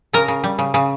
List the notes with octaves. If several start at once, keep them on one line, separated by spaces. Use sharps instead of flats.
C#3 A#4
C#3
G3
C#3
C#3